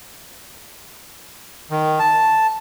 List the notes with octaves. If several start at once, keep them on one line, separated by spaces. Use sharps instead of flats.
D#3
A5